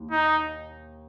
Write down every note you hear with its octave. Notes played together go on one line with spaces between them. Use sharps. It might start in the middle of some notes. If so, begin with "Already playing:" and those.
Already playing: D#2
D#4